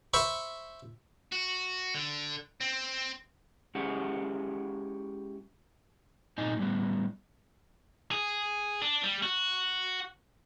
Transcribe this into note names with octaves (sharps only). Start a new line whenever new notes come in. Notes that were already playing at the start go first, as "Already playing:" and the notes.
C5 E5 B5 C#6
F#4
D3
C4
G#3 C#4 E4 G4 G#4 F#5
A#2 C4 D#4 D#5 G#5
A2 G3 B3
G#4
D4
G3
F#4